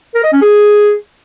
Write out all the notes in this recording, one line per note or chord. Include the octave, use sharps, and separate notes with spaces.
A#4
D#5
C#4
G#4